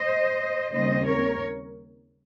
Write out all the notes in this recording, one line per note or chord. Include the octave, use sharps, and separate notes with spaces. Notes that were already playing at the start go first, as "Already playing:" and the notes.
Already playing: C5 D#5
D#2 C#3 G3 C4 C5 D#5
A#4 C#5